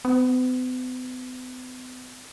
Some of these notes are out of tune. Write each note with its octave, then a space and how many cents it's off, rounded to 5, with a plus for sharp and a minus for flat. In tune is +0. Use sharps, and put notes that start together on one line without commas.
B3 +45